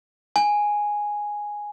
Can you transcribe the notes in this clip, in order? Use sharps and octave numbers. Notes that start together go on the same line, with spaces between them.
G#5